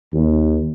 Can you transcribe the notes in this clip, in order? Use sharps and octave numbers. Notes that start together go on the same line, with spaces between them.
D#2